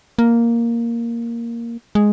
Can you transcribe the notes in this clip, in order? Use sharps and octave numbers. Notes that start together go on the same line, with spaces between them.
A#3
G#3